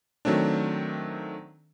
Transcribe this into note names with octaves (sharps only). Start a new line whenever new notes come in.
D#3 F#3 A3 C4 D4